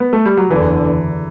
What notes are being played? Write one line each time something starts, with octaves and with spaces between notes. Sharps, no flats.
B3
A3
G3
F#3
F#1 E2 D3 E3